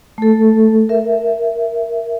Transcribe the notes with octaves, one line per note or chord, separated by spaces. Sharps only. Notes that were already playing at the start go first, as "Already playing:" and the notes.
A3 A4
A#4 E5